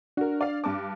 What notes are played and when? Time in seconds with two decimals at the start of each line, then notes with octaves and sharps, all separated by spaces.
0.17 D4 F#4 A#4
0.41 D5 F5
0.64 G2 A5 D6